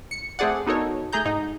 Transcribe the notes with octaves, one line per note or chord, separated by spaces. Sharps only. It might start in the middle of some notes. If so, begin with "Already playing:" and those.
C#7
A3 C4 G#4 D5 F#5
B3 D#4 F#4 A4 A#4 C#5
A3 G#4 A#5 G6
G#2 D#4